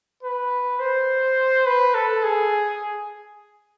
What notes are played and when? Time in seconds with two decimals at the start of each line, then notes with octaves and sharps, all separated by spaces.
0.23 B4
0.79 C5
1.66 B4
1.95 A4
2.23 G#4